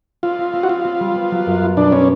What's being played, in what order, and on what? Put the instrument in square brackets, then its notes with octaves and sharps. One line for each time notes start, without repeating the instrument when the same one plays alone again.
[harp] C4 [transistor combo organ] F4
[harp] C4
C4
[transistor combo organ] F#4
[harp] C4 [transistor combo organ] F4
[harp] C4
G3
B3
F#3
F#2
B3
[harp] B2 [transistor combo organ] D4
[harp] B3 [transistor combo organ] C#4